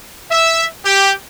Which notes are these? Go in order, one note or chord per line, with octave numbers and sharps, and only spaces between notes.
E5
G4